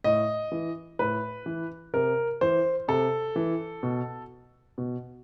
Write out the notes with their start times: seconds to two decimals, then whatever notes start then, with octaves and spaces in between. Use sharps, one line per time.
0.04 A2 D#5
0.52 E3
0.99 A2 B4
1.46 E3
1.94 C3 A#4
2.41 E3 C5
2.88 C3 A4
3.36 E3
3.83 B2
4.78 B2